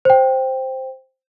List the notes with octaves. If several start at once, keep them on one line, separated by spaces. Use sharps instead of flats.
C5 G5